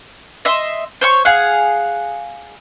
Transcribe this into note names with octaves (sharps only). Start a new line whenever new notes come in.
D#5 E5 C6
C5 C#5 C#6
G#4 F5 F#5